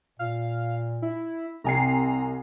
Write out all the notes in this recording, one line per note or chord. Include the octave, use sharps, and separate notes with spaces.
A#2 F5
E4
C2 C4 G#5 A#5 C7